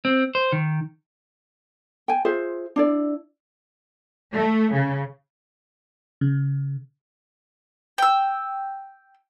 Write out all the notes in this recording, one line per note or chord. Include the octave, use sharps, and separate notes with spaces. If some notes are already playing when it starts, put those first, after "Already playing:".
C4
C5
D#3
G5 G#5
F4 G#4 C5 E5
D4 E4 D5
A3
C#3
C#3
G5 E6